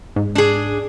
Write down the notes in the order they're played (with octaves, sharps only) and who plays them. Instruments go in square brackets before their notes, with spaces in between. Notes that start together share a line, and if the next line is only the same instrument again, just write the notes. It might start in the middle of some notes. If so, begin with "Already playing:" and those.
[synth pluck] G#2
[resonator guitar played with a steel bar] D4 G#4